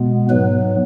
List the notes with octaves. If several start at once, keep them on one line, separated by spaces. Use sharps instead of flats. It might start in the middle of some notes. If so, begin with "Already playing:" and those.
Already playing: B2 G#3 B3
G#2 F#3 B3 B4